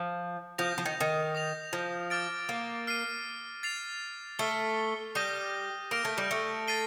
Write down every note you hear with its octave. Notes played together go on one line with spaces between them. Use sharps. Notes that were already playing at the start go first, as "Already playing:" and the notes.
Already playing: F3
F3 D#6 G6 A#6 F7
F3
D#3
D#3
D#6 A#6 F7
F3
D6 F6 A6 D7
A#3
F6 C7 D#7
A6 C7 F7
A3 F6 C7 G7
G3 D#6 G6 A#6 D#7 G7
A#3 F6 A#6 D7 F7
A3
G3
A3
A6 C7 D#7 G7